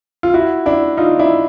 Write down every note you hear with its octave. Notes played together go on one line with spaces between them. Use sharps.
F4
E4 F#4
D4 E4
D#4 F4
D4 E4